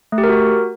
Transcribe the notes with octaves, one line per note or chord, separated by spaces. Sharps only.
A3
G4
A#4
F#4